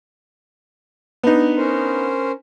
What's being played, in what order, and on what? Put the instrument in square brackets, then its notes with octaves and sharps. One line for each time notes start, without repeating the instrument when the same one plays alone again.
[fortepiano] B3 D4 D#4
[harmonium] C#4 A#4 C5